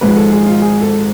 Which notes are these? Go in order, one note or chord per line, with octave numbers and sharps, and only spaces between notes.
G#1 G#2 F3 G#3 B4
A4
G#4
F4
G#4
A4